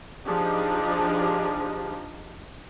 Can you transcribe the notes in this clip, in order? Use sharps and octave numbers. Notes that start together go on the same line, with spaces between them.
F3 D4 D#4 G4 G#4 D#5